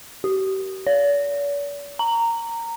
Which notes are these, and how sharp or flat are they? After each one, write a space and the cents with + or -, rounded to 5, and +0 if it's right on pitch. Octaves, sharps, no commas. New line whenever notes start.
G4 -40
D5 -45
A#5 -15